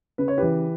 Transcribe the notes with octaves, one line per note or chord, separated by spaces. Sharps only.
C#3 B4
C#5
E3 G4 B4